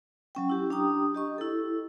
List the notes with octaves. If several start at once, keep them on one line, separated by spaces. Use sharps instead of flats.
F#3 C#4 G5
E4 G4
D4 G4 G5 A#5 D#6
G4 D#5 C#6
E4 A4